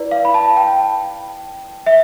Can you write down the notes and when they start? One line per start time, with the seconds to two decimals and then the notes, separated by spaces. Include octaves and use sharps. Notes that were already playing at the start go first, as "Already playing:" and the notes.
Already playing: E4 B4 D5
0.11 F5
0.25 B5
0.34 A5
0.57 G5
1.86 E5